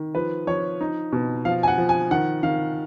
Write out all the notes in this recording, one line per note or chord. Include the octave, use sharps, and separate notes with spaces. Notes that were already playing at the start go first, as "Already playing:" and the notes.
Already playing: D#3
F3 B4
F3 C#5
D#4
B2
F3 F5
G#5
F#5
F3
G#5
D#3 F#5
D#3 F5